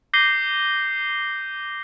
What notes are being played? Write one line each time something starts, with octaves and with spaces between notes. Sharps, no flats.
D6 G6 A#6 C7 D#7 G7